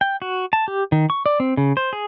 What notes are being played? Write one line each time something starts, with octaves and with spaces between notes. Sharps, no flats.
G5
F#4
A5
G4
D#3
C#6
D5
C4
C#3
C5
G#4